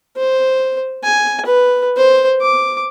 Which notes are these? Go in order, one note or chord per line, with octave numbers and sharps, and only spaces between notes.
C5
G#5
B4
C5
D6